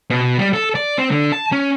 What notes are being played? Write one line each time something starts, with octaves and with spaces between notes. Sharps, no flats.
B2
G3
A4
D5
C4
D3
A5
C#4